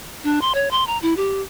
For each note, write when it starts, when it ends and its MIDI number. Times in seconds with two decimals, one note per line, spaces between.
0.24 0.39 62
0.41 0.52 84
0.54 0.71 73
0.71 0.86 84
0.87 0.98 82
1.02 1.16 64
1.17 1.41 67